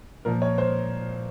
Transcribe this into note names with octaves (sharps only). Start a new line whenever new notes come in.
A#2 F3 A#4
C#5
C5